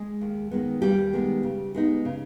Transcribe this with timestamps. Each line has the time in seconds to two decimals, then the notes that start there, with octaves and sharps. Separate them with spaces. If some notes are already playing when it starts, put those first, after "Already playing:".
Already playing: G#3 G#4
0.21 D#2
0.51 D#3 G#3 B3
0.82 D#2 G3 G4
1.13 D#3 G#3 B3
1.43 C#3
1.75 G#3 B3 D#4
2.05 C#3